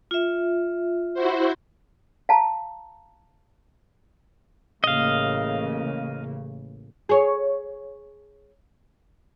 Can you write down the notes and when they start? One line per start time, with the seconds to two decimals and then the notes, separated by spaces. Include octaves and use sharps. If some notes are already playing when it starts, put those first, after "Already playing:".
0.11 F4 E5
1.14 E4 F#4 C5
2.29 F5 A5 A#5
4.84 A1 C#3 A#3 D#5 F5
7.09 G#4 C#5